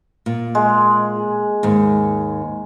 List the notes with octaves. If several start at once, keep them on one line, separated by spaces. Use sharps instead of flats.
A#2
G#3
D#2 G#2